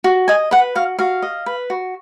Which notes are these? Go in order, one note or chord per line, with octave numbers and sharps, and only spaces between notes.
F#4
D#5 G#5
B4 F#5
F#4 F5
F#4 F5
D#5
B4
F#4